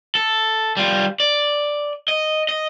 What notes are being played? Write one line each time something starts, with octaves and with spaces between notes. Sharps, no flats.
A4
G3 F4
D5
D#5
D#5